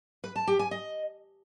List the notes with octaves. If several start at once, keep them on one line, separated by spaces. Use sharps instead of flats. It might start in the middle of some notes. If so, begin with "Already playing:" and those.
B4
A5
G4
G#5
D#5